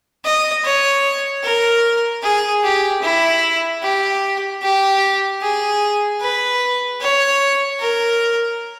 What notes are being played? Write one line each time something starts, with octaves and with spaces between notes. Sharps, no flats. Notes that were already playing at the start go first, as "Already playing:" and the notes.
D#5
C#5
A#4
G#4
G4
E4
G4
G4
G#4
B4
C#5
A#4